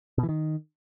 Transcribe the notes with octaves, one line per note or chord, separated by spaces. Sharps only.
B2
E3
D#3